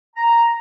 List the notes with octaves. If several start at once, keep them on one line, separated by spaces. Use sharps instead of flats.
A#5